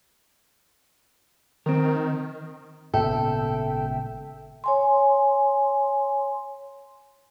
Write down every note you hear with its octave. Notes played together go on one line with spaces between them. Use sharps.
D#3 C4 A#4
G#1 A#2 C#3 B3 A4 E5 G5
C#5 G#5 C6